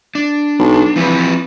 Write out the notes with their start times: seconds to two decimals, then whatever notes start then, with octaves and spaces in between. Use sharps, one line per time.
0.15 D4
0.59 B1
0.96 E3 F3 C4 B4